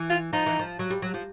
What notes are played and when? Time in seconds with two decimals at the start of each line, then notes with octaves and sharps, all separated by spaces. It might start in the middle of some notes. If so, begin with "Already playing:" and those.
Already playing: E3
0.10 F4
0.33 F3 D#4
0.46 E3
0.59 F3
0.79 F#3
0.90 G3
1.02 F#3
1.14 F3